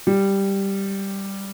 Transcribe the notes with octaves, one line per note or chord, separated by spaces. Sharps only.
G3